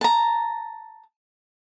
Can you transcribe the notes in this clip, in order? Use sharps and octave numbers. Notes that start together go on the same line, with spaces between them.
A5 A#5